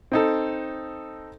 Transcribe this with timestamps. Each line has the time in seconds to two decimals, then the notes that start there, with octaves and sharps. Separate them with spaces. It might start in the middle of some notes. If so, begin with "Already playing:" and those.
0.12 C4 D#4 A4